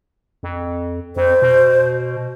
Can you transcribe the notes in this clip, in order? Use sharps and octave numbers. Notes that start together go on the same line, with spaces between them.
F2
F2 C5
B2